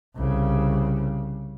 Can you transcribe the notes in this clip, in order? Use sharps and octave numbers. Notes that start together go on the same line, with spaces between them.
C2 C#3